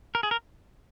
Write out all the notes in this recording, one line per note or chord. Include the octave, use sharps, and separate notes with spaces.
A#4
G#4
A#4